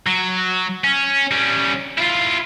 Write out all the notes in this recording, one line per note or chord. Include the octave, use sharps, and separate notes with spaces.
F#3
C#4
G3 C#4
E4 F4